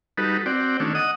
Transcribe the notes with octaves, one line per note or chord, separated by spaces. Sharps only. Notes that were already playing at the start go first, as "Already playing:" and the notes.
G3 D#4 F#4 A4 B4
C4 F#4 D5 G5
D#3 A3 C#4 D4
D#5 F#5 D#6